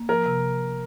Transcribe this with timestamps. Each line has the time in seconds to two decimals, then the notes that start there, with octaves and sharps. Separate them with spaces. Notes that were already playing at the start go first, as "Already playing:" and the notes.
Already playing: A#3
0.09 F3 A#4
0.26 C3